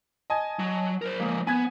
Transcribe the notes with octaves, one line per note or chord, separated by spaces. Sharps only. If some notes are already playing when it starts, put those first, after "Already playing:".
D#5 G#5 A5
F#3
A#4 C5
F3 G#3 A#3
B3 G#5 G#6